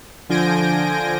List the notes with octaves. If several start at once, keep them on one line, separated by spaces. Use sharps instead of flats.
D3 F3 G#5 G6 A#6 D7